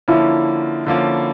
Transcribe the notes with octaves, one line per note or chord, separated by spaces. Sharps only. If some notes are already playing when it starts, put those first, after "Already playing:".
D3 F3 A#3 C#4 E4
D3 F3 A#3 C#4